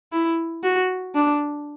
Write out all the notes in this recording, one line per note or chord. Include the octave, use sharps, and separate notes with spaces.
E4
F#4
D4